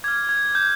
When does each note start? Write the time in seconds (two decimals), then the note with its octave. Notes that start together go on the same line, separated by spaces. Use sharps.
0.04 D6 F6 G#6
0.29 G#6
0.55 G6